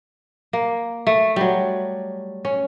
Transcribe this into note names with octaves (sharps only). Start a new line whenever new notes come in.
A#3
A3
F#3 G3
C#4